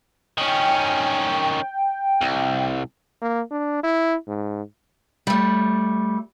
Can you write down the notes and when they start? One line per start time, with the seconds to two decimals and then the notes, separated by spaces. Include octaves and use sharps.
0.38 D#3 C#4 G5
2.22 C2
3.22 A#3
3.50 D4
3.83 E4
4.27 G#2
5.27 G3 A3